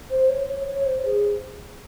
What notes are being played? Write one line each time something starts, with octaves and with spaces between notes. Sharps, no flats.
C5
C#5
C#5
C#5
C5
G#4